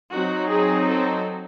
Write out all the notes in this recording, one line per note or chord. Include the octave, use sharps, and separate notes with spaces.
F#3 C4 D#4 F#4
G#4
A4